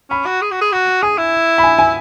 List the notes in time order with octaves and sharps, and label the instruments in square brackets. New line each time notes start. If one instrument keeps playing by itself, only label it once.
[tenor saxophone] C#4 [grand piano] B5
[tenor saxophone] F#4
G#4
F#4
G#4
F#4
[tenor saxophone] G#4 [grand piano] G#5
[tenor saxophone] E4
[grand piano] B5
G#5
G#5